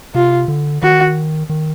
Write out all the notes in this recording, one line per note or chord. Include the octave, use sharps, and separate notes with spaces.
C3 F4
D3
D#3 F#4
D#3